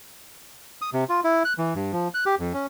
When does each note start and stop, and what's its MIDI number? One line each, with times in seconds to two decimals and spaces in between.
0.82 0.90 87
0.93 1.04 48
1.09 1.20 65
1.24 1.43 64
1.45 1.53 90
1.58 1.74 52
1.75 1.92 43
1.93 2.08 53
2.14 2.24 90
2.26 2.35 67
2.39 2.53 41
2.53 2.66 61